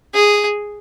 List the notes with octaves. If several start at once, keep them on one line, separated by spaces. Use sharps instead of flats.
G#4